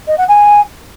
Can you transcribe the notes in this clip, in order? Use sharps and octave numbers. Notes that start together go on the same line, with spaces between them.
D#5
F#5
G#5